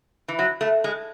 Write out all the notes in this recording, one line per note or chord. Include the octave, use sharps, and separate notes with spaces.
E3
F#3
A3
G#3